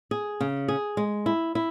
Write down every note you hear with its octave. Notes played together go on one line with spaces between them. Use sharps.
G#4
C#3
G#4
G#3
E4
E4